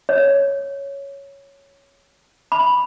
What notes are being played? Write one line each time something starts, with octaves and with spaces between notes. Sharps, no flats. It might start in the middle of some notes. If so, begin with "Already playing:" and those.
C#5
B5